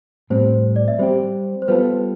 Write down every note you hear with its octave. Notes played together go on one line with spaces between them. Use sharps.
A2 G3 C4 C5
D5
E5
G3 C4 G4 C5
C5
G3 B3 F4 A4 B4